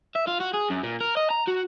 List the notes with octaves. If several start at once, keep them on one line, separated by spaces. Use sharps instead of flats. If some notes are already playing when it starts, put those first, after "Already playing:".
E5
F4
F#4
G#4
F#2
A#2
A#4
D#5
A#5
F#4